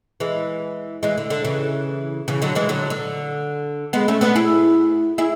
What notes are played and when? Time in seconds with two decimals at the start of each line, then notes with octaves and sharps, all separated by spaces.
0.20 E3 G#3
1.03 E3 G#3
1.18 D3
1.30 D3
1.45 C#3 E3
2.28 C#3 E3
2.42 D3 F#3
2.55 E3 G#3
2.69 D3 F#3
2.90 D3
3.93 G#3 B3
4.08 A3 C#4
4.21 B3 D4
4.35 E4 G#4
5.18 E4 G#4